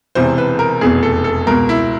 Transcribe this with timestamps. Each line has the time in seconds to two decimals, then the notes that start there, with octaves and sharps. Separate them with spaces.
0.15 E1 E2 C3 E3 C5
0.38 B4
0.59 A#4
0.81 F1 E2 B2 G#4
1.03 A4
1.24 A4
1.47 C#2 B2 A#4
1.69 E4